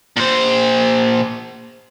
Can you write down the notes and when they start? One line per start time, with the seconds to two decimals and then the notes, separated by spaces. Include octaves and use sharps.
0.17 A#2 C5